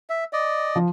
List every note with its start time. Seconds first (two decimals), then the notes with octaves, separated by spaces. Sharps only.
0.10 E5
0.33 D5 D#5
0.76 F3